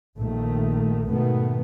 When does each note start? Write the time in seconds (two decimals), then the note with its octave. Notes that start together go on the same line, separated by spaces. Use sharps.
0.18 A#1 D#3 A3
1.08 G#2 B2 D#3 A3 B3